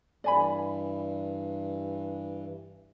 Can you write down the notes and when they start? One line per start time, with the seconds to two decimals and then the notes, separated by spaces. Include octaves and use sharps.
0.24 G2 E3 D5 G#5 B5